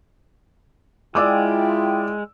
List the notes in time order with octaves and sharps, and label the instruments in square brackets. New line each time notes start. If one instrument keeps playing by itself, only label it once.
[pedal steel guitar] G#3 [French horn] E4 [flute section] F4 G5 [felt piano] D5 D6 E6